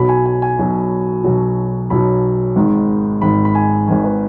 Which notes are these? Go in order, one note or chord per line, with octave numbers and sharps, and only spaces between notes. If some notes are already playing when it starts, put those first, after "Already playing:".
Already playing: B1 B2 F#3 B5
G#5
G#5
G#5
B1 B2 F#3
B1 B2 F#3
B1 B2 F#3 B5
G#1 G#2 D#3
G#1 G#2 D#3 B5
B5
G#5
G#1 G#2 D#3 G#5
B4